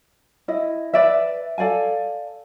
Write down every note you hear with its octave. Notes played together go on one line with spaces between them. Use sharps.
E4 D#5
B4 D5 E5
A4 D5 F5 G#5